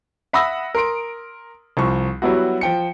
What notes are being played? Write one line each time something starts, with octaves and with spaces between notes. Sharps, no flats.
E5 F#5 B5 D#6 E6 A#6
A#4 C6 D7
C2 F3 C#6
F#3 G3 B3 E4 F#4
F3 G5 C#7